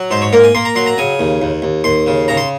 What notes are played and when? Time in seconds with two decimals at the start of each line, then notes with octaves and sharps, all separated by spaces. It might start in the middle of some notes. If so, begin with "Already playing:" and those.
Already playing: F#3
0.11 G#2 C5
0.22 C#5
0.33 A#3 A#4
0.44 G#5
0.55 A#3 C6
0.65 A#5
0.75 F#3 C6
0.86 A#5
0.98 C#3 G#5
1.19 D#2
1.42 D#2
1.62 D#2
1.84 D#2 C6
2.07 C#3
2.28 C#3 A#5
2.37 C6